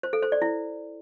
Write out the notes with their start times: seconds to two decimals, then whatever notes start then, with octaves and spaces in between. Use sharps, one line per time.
0.03 C5
0.13 A4
0.23 C5
0.32 D5
0.42 E4